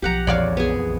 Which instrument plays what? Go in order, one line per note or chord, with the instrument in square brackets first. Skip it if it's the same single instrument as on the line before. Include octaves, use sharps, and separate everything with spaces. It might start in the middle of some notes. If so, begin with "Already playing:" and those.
[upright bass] B1 F3 [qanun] G4 F#5 A#5
[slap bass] A#1 F2 E3 [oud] C#5 D5 F5
[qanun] B3 G#4